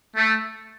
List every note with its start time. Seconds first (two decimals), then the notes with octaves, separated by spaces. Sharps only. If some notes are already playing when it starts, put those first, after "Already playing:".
0.15 A3